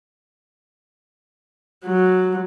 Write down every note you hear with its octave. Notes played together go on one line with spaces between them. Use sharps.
F#3